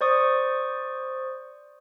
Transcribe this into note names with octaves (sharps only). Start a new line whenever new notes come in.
C5 D5 C#6 D#6